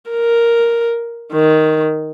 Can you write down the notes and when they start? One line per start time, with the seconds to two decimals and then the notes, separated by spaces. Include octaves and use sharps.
0.11 A#4
1.33 D#3